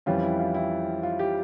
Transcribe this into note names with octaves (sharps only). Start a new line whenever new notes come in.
F2 E3 G3 C#4 F4
E4
F4
E4
F4
G4